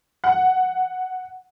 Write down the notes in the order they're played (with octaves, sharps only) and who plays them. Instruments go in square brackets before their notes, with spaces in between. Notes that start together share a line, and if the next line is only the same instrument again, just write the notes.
[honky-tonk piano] F#5